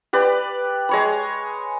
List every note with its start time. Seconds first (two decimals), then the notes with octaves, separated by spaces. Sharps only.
0.13 G4 B4 D5
0.89 G#3 C#5 B5